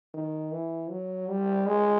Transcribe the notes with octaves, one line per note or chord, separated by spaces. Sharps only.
D#3
E3
F#3
G3
G#3